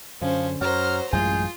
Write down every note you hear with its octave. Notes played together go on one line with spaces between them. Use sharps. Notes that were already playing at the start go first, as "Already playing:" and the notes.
F#2 D3 F3 C#4 C5
F#2 F#3 C5 A#5 F6
A1 F#2 G#3 F4 G#4 G6